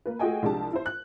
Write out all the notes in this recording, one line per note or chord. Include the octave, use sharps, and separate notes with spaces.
A#3 B4
A3 F#4 G#4 D#5 G5 G#5
C2 F3 G#3 D4 G4 A5
E4 C5
F#6